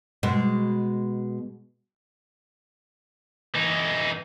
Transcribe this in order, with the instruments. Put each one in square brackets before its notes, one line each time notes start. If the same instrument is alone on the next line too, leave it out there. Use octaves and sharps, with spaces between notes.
[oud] B2 G#3
[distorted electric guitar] E3 D#4